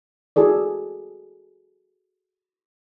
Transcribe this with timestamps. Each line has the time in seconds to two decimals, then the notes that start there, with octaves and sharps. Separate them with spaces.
0.36 E4 F#4 G#4 A4 D5